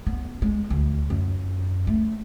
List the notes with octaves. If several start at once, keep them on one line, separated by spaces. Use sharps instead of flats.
B3
G#3
D2
F#2
A3